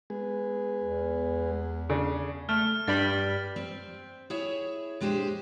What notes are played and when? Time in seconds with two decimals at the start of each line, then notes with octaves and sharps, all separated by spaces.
0.10 G#3 B3 G#4
0.83 E2
1.90 C#3 D4
2.49 A3 F6
2.88 G2 G3 B5 A6
3.56 C4
4.30 E4 G#4 C#5 E5
5.00 A#2 G#3 D4 G4 C5